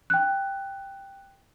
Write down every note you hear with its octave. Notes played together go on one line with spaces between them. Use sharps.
G5 F#6